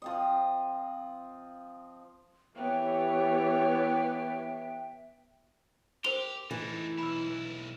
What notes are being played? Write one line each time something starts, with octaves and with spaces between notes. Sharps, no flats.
F3 C4 D#5
E3 B3 G4 C#5 E5 G5
G4 A#4 C5 C6 F7 G7
E3 A3 D#4
B1 E4 B5 E6